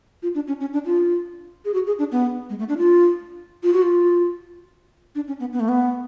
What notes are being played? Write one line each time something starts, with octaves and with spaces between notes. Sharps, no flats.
F4
D4
C#4
C#4
D4
F4
G#4
F#4
G#4
D4
B3
G#3
A3
D4
F4
F4
F#4
F4
D4
C#4
B3
B3
A3
B3